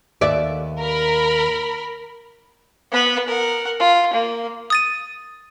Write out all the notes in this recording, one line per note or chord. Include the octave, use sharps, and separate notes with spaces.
D#2 D5 E5
A#4 B5
B3 B4
A#4 F#5
F4
A#3
D#6 A6 D#7